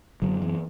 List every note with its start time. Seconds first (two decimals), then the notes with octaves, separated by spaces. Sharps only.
0.22 F#2 D3 F#3
0.42 E3